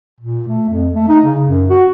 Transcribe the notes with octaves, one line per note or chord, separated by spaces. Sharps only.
A#2
A3
F2
A3
D#4
C#3
F#2
F#4